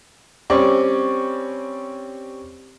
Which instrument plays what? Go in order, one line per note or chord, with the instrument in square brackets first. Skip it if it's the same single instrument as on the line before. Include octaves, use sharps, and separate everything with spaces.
[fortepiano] G3 C4 C#4 D5 C#6